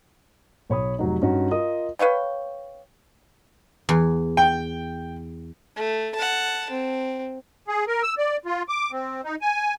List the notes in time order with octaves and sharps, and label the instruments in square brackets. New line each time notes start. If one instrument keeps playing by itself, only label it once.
[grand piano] B1 C#5 B5 D#6
F1 F#3 D#4
G2 C#4 D#4 F#4
F4 A#4 D#5 D#6
[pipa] B4 C#5 F5 G5
[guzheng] E2
[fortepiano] G5
[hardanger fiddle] A3
F#5 A5
C4
[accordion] G#4
A#4
E6
D5
F4
D6
C4
D#4
G#5